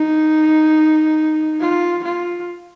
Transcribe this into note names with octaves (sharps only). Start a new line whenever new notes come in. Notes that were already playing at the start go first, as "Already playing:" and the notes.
Already playing: D#4
F4
F4